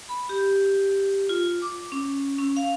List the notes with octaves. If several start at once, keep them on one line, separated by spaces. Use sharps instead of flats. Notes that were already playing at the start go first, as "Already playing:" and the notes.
B5
G4
F4
D6
C#4
C#4
F5